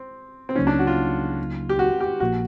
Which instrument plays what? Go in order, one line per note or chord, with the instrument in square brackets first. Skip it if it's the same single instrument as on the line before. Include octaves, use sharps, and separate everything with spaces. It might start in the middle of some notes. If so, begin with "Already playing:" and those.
Already playing: [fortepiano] C4
C4
[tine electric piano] C#2 C#3 F#3 A#3 D#4 [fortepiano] C#4
[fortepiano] D4
F#4
F4
G4
F#4
G4
[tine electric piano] A#1 A#2 F3 A#3 [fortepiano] F#4